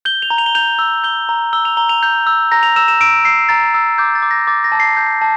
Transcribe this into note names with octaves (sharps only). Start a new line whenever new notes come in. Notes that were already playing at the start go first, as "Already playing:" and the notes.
G6 G7
F7
A#5
F7
G7
G6 F7
E6
G6 G7
A#5
E6 G7
F7
A#5 G7
F7
G6
E6
A#5 A#6
F7
E6 E7
E7
E6 D7
E6 C7
A#5 A6
E6
D6 G6
A6
D6
A#6
D6 A6
A#6
A5
C7
G6
A5